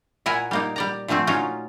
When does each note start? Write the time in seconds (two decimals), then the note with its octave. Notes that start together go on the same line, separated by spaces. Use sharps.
0.26 A#2 E4 A#4 F#5 G#5
0.51 G3 A#3 D#4
0.76 G3 D5 A#5
1.08 A#2 D3 F3 A3 C4
1.27 F#3 C#4 D#4 F4